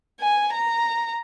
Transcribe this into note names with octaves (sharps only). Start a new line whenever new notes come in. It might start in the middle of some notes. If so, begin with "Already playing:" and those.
G#5
A#5